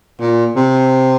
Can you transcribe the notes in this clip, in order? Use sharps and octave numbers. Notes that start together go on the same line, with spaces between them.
A#2
C3